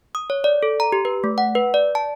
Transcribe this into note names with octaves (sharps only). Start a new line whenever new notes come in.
D#6
C#5
D5
A4
A#5
G4
B4
A3
F#5
B4
D5
A5